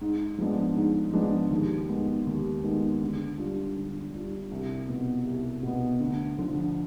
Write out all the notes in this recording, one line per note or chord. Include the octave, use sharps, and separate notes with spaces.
G#2
F3 G#3 B3 D4
G#2
F3 G#3 B3 D4
D#2
D#3 G#3 B3
D#2
D#3 G#3 B3
D3
G3 D4 F4
D3
G3 D4 F4
C2
B2 B3
C2
B2 B3
D2
D3 F3